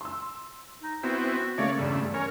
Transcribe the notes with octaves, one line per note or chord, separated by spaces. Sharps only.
C6 E6
D#4
B3 C4 E4 F#4
C#3 A3 A#3 C#5 D5
E2 G2 C#3 G3 A3
C#4 A#4 C#5